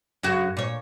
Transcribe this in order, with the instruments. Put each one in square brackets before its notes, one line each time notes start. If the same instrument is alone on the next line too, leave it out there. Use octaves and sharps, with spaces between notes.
[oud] F#2 C#3 F#4
A#2 C#5